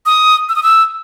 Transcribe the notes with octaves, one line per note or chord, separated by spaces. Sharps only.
D#6
E6
D#6
E6